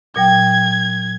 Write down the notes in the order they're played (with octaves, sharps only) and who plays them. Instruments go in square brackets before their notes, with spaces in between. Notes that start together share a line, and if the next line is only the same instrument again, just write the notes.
[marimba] A#2 F#3 G5 [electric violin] G#6